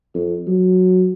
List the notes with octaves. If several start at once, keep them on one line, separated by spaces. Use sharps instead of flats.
F2
F#3